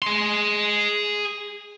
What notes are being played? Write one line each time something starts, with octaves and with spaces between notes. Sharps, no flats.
G#4 C6